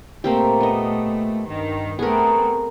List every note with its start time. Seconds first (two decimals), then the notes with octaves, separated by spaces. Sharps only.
0.24 A#2 A3 A#3 C4 G4
0.61 B3 D#5
1.47 G2 D#3
1.99 A3 B3 C4 G#4 A#4